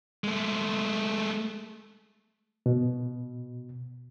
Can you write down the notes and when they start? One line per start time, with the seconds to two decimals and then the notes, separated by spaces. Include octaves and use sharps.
0.24 G#3 A3
2.66 B2